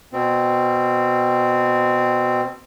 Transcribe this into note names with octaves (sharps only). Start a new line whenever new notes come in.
B2 C4